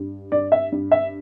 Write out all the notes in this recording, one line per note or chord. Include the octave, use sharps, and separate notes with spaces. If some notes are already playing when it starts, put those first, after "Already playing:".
Already playing: G2
G2 D5
E5
G2
E5